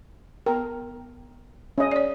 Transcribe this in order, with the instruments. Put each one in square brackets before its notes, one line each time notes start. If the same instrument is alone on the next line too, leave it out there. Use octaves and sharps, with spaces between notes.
[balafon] B3 G5 [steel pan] A#4
[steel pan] C#4 D#5
[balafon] C#5 D5